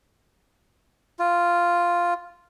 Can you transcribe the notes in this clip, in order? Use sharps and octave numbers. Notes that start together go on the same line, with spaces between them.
F4